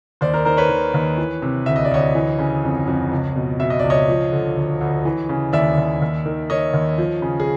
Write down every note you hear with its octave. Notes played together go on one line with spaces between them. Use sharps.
D#2 C5 D5
A#4 C5
D#3 A#4 C5
B4 C#5
D#3
D#2
E3
C3
D2 E5
D#5
D5
D2 C#5 D#5
E3
C#3
F2
F2
C#2
B2
B2 E5
D#5
C#2 D5
C#5 D#5
F3
D3
D2
D2
E3
C#3
D#2 D5 E5
D#2
D#2
D#3
D#3 C#5 D#5
D#2
F3
C#3
G#4